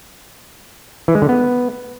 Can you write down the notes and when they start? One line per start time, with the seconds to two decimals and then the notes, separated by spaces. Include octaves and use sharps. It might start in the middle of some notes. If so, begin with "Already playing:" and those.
1.08 E3
1.15 G#3
1.22 D3
1.29 B3